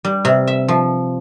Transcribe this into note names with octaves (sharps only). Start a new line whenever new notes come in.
G3
C3
E5
F3